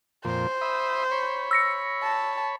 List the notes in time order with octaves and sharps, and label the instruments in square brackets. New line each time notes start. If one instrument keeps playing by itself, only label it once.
[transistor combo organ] F2 A#2 [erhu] C5
[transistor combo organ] E5 B5 D#6
C#5 B5
[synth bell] E6 A#6 C#7
[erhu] A5